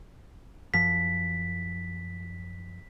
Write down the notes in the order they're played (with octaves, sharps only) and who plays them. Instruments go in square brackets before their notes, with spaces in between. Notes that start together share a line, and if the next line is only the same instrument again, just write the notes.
[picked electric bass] F#2 F3 [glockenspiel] B6